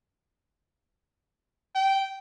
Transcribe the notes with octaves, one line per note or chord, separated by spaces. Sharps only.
G5